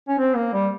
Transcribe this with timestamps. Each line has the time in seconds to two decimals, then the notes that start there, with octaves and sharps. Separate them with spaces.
0.08 C#4
0.18 C4
0.35 A#3
0.53 G3